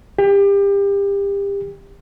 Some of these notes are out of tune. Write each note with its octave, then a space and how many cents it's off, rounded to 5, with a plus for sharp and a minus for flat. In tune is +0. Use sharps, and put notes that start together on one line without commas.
G4 +30